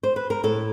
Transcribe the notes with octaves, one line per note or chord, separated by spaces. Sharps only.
C5
B4
A#4
A2 A4